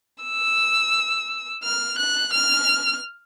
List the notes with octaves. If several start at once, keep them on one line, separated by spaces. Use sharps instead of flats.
E6
F6
F#6
F6